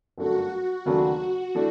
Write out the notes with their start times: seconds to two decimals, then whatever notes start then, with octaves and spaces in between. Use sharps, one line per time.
0.18 G1 F#2 D3 F#3 A3 F#4
0.51 F#4
0.85 D#2 C#3 F#3 A3 D4 F#4
1.20 F#4
1.55 E3 A3 D4